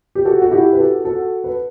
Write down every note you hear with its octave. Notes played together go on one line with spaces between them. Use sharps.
G4
F#4 A4
F#4
E4 G4
B4
F#4 A4
F#4 A4
B4